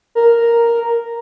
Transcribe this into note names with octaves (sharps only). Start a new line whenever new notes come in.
A#4